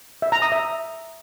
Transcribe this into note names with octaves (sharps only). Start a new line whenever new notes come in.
E5
A#5
D#6
E5